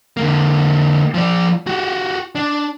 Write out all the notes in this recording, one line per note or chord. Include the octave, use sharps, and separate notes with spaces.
D3 A#3
F3 D5
F#4 G4
D4